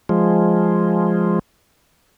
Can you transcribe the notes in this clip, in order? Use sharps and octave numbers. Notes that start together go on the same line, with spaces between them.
F3 G#3